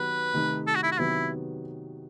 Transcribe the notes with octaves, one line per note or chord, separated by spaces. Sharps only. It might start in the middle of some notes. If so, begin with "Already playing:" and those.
Already playing: D#3 F#3 B3 D#4 G4 B4
C3 D#3 A3 D#4
A4
F#4
E4
F#4
C3 D#3 F#3 B3 E4